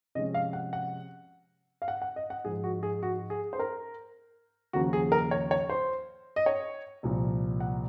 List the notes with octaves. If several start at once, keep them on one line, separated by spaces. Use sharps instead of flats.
C3 F3 G#3 C#4 D#5
F5
F#5
F#5
F5
F#5
F#5
D#5
F#5
G#2 F3 G#3 G#4
F#4
G#4
F#4
G#4
C5
A#4
D#2 C#3 F3 A#3 F#4
G#4
A#4
C#5
C#5
C5
D#5
C#5
C2 A#2 F3
F#5